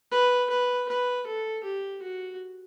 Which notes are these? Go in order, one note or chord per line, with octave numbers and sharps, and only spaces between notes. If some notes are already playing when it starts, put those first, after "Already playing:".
B4
B4
B4
A4
G4
F#4